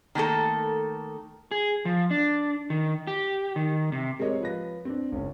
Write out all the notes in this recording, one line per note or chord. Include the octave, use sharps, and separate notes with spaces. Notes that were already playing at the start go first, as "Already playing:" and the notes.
D#3 A3 A#3 A4
G#4
F3
D4
D#3
G4
D#3
C3
G#3 C4 G4 A#4 C#5 D#5
F3 B4 A#6
C4 D4
F#1 C#2 C#4